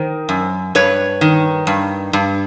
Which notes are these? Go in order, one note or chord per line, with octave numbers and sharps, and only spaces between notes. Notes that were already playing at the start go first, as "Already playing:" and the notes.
Already playing: D#3 A#4 C5
F#2
G2 B4 C#5
D#3
G2
G2